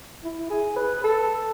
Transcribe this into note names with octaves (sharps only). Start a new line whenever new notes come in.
E4
G#4
B4
A4